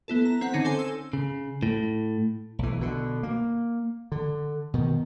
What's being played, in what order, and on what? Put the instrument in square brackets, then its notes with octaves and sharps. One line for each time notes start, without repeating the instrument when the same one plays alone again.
[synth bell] B3 E4 A4
A#5
C4 F#5
D3 C#4 D#4 A#6
A4 C5 G#5 C6
E6
[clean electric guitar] C#3
A2
[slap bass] B1 E3
B2 D3
A#3
D3
B2 D#3